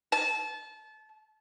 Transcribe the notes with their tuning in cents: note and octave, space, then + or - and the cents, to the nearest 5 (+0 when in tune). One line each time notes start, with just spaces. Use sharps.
A5 -25